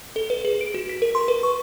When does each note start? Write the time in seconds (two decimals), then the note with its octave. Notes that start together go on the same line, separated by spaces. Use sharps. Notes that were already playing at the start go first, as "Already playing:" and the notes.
0.16 A4
0.30 B4
0.45 G#4
0.61 D7
0.74 F#4
0.89 B6
1.02 A#4
1.15 C6
1.28 B4
1.43 C#6